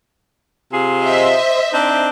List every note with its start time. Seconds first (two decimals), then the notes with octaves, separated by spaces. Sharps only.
0.72 C3 F4 G#4
1.02 C5 D#5 E5
1.73 C4 D4 D#4